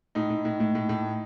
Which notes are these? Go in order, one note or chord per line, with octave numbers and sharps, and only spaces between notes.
A2 D#4
A2
A2
A2
A2
A2